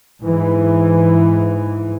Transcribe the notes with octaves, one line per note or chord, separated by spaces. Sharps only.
G#2 E3